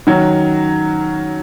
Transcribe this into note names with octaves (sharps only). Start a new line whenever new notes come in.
D#3 F#3 C#4 F#4